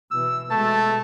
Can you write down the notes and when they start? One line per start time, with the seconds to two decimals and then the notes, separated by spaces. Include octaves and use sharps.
0.11 B2 E3 E6
0.51 B2 G#3 A3 A5